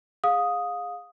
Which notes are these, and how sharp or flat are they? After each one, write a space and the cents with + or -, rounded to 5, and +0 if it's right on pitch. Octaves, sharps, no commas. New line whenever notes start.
G#4 -15 F5 +30 D#6 +0